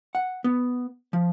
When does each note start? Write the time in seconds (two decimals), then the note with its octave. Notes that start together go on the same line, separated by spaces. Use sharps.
0.15 F#5
0.44 B3
1.13 F3